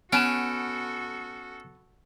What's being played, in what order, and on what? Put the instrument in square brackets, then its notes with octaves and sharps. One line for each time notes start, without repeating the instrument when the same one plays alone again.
[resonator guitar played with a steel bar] B3 G#5 [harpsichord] C#4 [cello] F#4 A4 [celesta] D7 E7